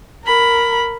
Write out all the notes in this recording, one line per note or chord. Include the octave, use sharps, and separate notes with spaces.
A#4 B5